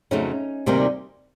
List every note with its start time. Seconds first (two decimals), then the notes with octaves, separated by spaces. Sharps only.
0.11 F2 C#3 F#3 A3 C#4 D#4
0.66 D2 C3 D#3 G3 A#3